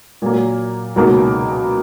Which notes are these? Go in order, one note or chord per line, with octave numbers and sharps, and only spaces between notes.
A#2 F#3 A#3
C#2 B2 F#3 A#3 D#4